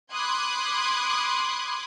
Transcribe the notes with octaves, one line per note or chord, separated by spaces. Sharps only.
B5 C6 D6 D#6 F#6 G#6